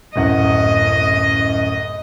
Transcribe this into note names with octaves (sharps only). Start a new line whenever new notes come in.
D1 F#2 D#5 F#5